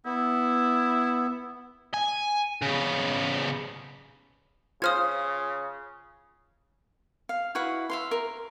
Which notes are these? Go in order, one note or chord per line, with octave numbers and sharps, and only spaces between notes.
B3 E4
G#5
C#3 B3
C#3 F4 C5 D#6 F6 G#6
F5
E4 F#4 B4 F5
E5 F5 C6
A#4